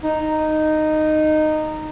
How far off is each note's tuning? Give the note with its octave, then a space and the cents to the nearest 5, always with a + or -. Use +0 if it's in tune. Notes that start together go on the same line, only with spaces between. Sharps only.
D#4 -10